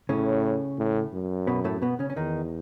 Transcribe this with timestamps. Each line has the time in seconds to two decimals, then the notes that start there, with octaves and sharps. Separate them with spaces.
0.09 A2 C#3 C#4
0.78 A2
1.13 F#2
1.47 B2 B3
1.64 A2 A3
1.82 B2 B3
1.99 C#3 C#4
2.10 C#4
2.16 E2 D#3 D#4